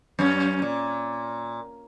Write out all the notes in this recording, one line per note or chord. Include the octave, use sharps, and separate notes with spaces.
F#2 C#4
A#2